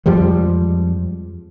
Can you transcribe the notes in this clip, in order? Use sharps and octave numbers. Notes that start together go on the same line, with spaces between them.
F2 F3 G3 G#3